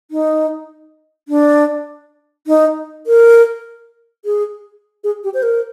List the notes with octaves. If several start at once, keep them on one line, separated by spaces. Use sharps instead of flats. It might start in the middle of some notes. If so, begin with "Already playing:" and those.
D#4
D4
D#4
A#4
G#4
G#4
G4
C5
A#4